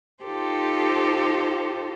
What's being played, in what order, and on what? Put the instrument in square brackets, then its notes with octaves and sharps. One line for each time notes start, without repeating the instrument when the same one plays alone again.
[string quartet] D#4 F4 G4 A4 C5